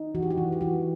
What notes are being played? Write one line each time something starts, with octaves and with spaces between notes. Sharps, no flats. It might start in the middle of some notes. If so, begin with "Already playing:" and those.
Already playing: D#4
E3 F#4
G4
F#4
E3
G4
E3 F#4